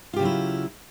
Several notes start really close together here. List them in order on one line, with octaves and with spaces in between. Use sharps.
F4 G4 C#3 F#3 E4